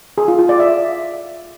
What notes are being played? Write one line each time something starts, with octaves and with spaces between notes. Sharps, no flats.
G#4
F4
F4
D5
E5